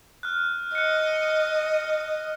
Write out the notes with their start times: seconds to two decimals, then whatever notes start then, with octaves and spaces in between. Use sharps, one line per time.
0.23 F6 F#6
0.75 D#5 F#6 C#7